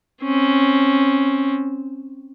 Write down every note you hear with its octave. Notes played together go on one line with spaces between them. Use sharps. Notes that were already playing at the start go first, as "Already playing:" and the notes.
C4 C#4